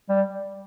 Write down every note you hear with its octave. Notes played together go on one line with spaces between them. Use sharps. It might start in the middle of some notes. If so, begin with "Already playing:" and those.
G3